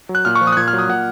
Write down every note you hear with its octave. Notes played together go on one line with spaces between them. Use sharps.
F#3
F#6
A#2 F6
C#6
F3
D#6
F#6
A#2 G#6
F6
F#3
D#6
A#2 F#5